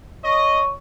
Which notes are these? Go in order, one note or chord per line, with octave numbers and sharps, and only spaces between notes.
C#5 D#5